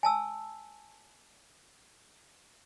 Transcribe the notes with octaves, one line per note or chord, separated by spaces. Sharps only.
G#5 A5 E6